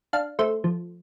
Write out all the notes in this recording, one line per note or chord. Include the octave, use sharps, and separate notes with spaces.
D4 F5
A3 C5
F3